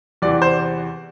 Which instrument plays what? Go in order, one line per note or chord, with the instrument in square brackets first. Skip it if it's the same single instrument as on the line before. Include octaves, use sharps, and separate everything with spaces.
[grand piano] E2 C3 E3 D5
C5